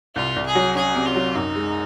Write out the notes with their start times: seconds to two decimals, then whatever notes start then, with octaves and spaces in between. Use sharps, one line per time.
0.16 C2 F4
0.36 C2
0.46 G#4
0.55 F#3
0.75 C#4 G#4
0.96 C3
1.06 F4
1.16 F#3
1.35 F#2 D#4
1.56 G#3